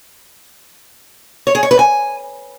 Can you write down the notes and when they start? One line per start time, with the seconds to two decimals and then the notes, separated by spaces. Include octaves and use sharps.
1.47 C#5
1.55 G#4
1.63 C#5
1.71 B4
1.79 G#5